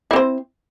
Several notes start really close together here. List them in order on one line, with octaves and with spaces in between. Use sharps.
E4 C4 C5